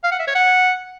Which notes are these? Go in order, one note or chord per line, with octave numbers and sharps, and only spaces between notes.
F5
F#5
E5
C#5
F#5